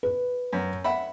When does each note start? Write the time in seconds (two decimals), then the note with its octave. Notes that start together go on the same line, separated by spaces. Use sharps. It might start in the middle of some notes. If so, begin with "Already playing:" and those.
0.03 B4
0.53 F#2
0.84 E5 F#5 B5